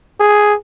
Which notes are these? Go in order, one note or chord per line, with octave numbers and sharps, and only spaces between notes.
G#4